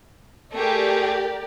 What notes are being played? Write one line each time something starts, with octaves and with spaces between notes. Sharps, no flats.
A3 G4 G#4 A#4 D5